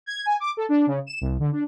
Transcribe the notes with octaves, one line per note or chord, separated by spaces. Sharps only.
G#6
G#5
D6
A4
D4
C#3
E7
C2
D3
D4